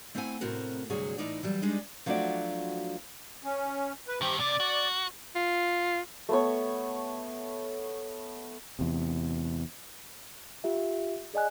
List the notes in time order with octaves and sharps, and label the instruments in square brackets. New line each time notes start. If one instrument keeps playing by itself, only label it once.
[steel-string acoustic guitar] A3 C4 E4 C5 F#5 G#5
A2 C3 C4 F#4 A#4
D2 G2 C3 F#3 F#4 G#4
A2 E3 D#4 D5
E3 F#3 G3
G3 G#3 D4 D#4 G#4 D#5
[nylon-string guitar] F3 F#3 A3 D4 F#4 D5
[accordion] C#4
B4
[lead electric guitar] G2 D#3 [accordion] C4 G4
[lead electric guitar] C3 [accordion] D5
[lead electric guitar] F#4
[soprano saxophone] F4
[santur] A3 B3 C#5
[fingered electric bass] E2 C3
[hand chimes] F4 G4 E5
G#4 D5 D#5 G#5 F#6